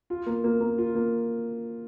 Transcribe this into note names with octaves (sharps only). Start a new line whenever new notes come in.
F4
A#3
A#3
A#3
F4
A#3